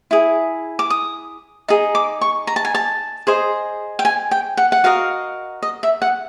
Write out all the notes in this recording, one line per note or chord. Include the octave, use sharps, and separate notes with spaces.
E4 G#4
D6
D#6
D#4 G#4
D6
C#6
A#5
A5
G#5
A5
G#4 C5 D#5
G5
G#5
G5
F#5
F#5
F#4 A#4 D#5 F5
D#5
E5
F#5